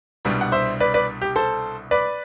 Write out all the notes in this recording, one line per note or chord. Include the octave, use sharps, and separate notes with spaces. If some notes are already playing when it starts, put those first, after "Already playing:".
C2 B2 G3 D4
F#5
C5 E5
B4 D5
B4 D5
G4
A4 C5
B4 D5